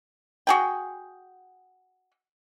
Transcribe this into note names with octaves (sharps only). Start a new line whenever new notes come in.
F#4 G#4 G5